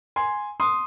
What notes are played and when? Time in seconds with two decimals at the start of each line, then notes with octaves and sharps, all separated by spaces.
0.16 G#5 C6
0.60 C6 D#6